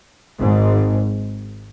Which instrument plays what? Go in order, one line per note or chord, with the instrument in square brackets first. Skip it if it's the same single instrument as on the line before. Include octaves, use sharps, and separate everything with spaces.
[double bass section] G#1 G#2